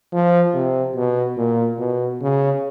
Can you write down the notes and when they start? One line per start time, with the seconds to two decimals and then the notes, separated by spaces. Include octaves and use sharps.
0.12 F3
0.54 C3
0.95 B2
1.37 A#2
1.79 B2
2.21 C#3